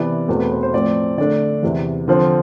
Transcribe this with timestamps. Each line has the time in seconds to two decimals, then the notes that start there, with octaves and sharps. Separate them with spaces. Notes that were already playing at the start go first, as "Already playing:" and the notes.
Already playing: C3 E3 B3 D5
0.28 E2 B2 A3 C4
0.40 B4
0.52 C5
0.63 C5
0.73 A2 F3 C4 D5
1.18 D3 A3 D4 D5
1.62 E2 C3 E3
2.08 D3 F3 C4